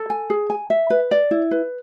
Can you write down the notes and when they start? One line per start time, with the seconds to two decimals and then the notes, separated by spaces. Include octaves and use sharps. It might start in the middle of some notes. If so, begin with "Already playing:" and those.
Already playing: A4
0.10 G#5
0.30 G#4
0.50 G#5
0.70 E5
0.90 B4
1.11 D5
1.31 E4
1.51 B4